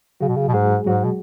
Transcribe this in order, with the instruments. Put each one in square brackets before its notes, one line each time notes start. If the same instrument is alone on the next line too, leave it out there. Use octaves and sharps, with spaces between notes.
[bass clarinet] C#3 [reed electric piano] F#3 F#4
[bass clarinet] B2
C#3
B2
[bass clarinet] G#2 [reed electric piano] G#3 G#4
[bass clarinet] G#2 [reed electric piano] F#3 F#4
[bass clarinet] B2